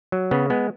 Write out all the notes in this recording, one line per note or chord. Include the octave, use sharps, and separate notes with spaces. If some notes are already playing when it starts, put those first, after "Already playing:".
F#3
C#3 B3
G#3 B3